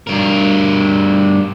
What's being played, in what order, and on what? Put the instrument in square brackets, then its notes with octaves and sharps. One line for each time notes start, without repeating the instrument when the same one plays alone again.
[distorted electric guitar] G2 A#4